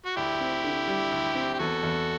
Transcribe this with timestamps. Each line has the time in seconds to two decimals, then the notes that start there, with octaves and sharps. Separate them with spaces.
0.06 F#4
0.16 D2 E4 G4
0.40 C4
0.64 D3
0.88 G3
1.12 D2
1.35 C4
1.54 G4
1.59 E2 F#4 A4
1.83 E2